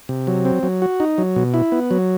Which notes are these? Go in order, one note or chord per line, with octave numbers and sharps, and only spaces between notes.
C3
F#3
C4
F#3
F#4
D#4
F#3
B2
E4
B3
F#3